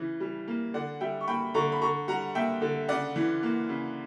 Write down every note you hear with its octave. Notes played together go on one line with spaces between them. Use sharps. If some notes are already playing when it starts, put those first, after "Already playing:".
Already playing: C#3 E3
G3
A#3
D3 D5 F#5
G3 E5 G5
C#6
A#3 G5 B5
D3 A#5 C#6
B5
D3 A#5 C#6
G3 F#5 A#5
A#3 E5 G5
D3
C#3 D5 F#5
E3
A#3
C#3